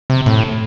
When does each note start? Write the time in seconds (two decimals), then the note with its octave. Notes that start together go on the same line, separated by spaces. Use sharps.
0.10 C3
0.26 A2